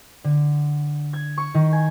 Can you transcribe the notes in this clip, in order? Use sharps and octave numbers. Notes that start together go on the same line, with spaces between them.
D3
G#6
C#6
D#3
G#5